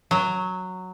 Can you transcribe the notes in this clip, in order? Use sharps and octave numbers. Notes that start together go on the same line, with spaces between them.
F#3